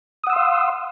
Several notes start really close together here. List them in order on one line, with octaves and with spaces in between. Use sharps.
D#6 F#5 E6 C6 F5